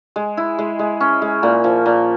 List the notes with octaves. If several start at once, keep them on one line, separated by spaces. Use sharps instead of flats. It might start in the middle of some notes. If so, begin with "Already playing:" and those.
G#3
E4
G#3
G#3
C#4
G#3
A#2
F3
A#2